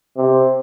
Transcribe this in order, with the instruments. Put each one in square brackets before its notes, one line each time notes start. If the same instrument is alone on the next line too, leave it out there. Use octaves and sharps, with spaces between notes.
[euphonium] C3